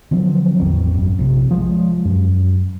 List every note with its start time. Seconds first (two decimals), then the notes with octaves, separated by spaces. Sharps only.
0.11 D3 F3 F#3 C4
0.59 A1 E2 C4
0.94 A1 F#2
1.19 A#1 C3
1.51 F3 G#3
2.05 F#2